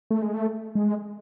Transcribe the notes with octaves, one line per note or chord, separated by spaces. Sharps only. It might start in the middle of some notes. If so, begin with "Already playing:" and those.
A3
G#3
A3
G#3